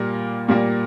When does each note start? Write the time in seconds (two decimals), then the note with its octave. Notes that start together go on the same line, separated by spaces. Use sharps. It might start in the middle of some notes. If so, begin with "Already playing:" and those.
Already playing: A#2 G3 A#3
0.48 A#2 G3 A#3